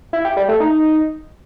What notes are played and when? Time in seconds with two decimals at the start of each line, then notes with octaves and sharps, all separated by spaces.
0.13 E4
0.25 G4
0.37 G3
0.48 A3
0.60 D#4